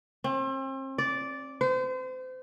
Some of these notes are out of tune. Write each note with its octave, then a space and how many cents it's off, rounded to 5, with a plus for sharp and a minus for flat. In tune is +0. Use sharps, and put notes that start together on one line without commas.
C4 +40
D5 -10
C5 -35